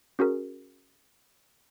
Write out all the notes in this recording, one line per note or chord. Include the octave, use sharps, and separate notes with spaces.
C#4 F#4 G#4 A#4